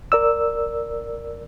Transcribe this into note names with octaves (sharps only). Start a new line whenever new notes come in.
A#4 D5 E6